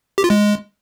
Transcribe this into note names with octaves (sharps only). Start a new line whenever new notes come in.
G4
F4
G#3